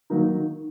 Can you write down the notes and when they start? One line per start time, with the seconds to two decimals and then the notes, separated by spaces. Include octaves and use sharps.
0.10 D#3 F#3 A#3 D#4
0.34 D#3